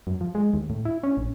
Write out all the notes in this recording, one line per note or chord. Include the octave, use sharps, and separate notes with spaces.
F#2
F3
G#3
D#2
A2
E4
C#4
A1